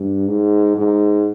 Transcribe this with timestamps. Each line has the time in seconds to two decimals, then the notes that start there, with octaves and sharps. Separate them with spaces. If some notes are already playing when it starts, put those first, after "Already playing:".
Already playing: G2
0.28 G#2
0.77 G#2